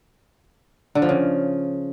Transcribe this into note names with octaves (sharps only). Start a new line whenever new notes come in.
D3
F3
C#3